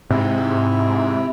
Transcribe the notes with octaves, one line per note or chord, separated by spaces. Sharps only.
G#2 C3 E4